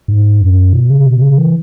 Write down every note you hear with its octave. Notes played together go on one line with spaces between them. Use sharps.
G#2
F#2
B2
C#3
B2
C#3
E3